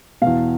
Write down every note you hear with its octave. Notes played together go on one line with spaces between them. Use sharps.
B2 F5
E2